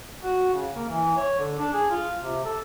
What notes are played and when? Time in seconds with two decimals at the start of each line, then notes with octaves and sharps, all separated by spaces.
0.24 F#4
0.54 C#3
0.76 A#3
0.89 E3
1.17 C#5
1.39 D3
1.59 D4
1.74 G#4
1.91 F4
2.21 C3
2.45 A4